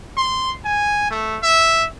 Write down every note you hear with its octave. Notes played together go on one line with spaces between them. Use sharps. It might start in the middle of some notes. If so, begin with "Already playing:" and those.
C6
G#5
A3
E5